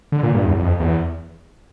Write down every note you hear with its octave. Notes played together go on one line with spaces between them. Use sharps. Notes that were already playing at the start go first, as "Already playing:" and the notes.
D3
A#2
G2
E2
F2
E2